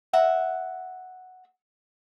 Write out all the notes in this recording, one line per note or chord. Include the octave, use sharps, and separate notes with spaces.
E5 F#5 A#5